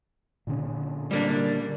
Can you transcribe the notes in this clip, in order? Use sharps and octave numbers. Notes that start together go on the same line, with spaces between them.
A#2 D3 C#4
G3 A#3 D4